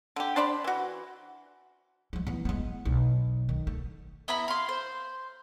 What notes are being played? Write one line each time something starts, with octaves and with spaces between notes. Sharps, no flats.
D3 G4
D4 C5 D5 B5
E3 F#4
F3 G#3
E3 B3
G#3 B3
B1
D#3
A3
B3 E4 A#5 B5
F5 C6
C5